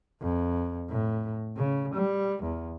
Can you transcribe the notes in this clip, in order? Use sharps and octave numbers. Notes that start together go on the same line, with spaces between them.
F2
A2
C#3
G3
E2